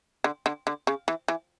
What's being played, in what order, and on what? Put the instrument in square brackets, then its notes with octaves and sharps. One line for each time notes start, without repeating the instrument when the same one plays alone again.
[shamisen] D3
D3
D3
C#3
E3
E3